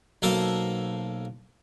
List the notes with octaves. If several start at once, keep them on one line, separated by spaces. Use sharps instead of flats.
B1 A#3 A4 A#4 C5